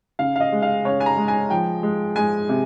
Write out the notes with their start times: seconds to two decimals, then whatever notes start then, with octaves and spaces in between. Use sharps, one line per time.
0.19 C#3 F5
0.36 F5
0.40 D#5
0.52 G#3
0.62 F5
0.85 C#3 C#5
1.00 G#5
1.06 A#5
1.17 G#3
1.28 G#5
1.50 F3 G5
1.83 G#3
2.16 G#3 G#5
2.49 C3